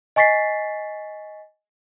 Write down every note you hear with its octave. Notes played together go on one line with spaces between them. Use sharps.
D#5 G#5 C#6 A6 B6 C7